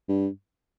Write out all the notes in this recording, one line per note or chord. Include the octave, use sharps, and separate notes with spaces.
G2